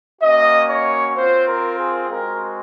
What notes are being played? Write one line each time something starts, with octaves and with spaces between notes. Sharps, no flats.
A#3 C#4 F#4 D#5
C#5
C4 F4 C5
A#4
G#4
G#3 C4 F#4 A#4